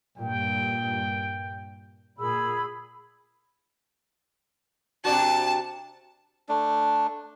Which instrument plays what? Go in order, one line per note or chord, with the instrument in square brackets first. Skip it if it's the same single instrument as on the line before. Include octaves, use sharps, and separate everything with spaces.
[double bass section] G2 A#2 [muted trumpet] G5
[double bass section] A#2 [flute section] G#4 B5 E6
[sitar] C3 D4 F#4 [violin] A5
[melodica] A3 D4